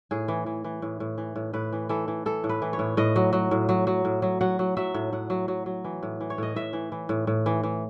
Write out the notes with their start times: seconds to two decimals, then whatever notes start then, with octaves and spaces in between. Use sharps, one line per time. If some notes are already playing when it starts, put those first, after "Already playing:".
0.11 A2 G#4
0.28 E3
0.46 E3
0.64 E3
0.82 A2
1.00 A2
1.18 E3
1.36 A2
1.53 A2 B4
1.72 E3
1.89 E3 A4
2.08 E3
2.26 E3 A4
2.44 A2
2.49 B4
2.62 E3
2.73 C#5
2.79 A2
2.97 A2 D#5
3.16 F#3
3.33 F#3
3.51 A2
3.69 F#3
3.87 F#3
4.05 A2
4.22 F#3
4.41 F#3 F#5
4.59 F#3
4.77 F#3 E5
4.94 A2
5.13 A2 F#5
5.30 F#3
5.48 F#3
5.66 F#3
5.84 E3
6.03 A2
6.20 E3
6.30 C#5
6.38 A2 D#5
6.56 A2 E5
6.73 E3
6.92 E3
7.09 A2
7.27 A2
7.46 E3
7.63 E3